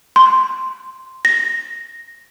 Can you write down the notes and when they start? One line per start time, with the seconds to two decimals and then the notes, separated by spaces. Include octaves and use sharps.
0.16 C6
1.25 A#6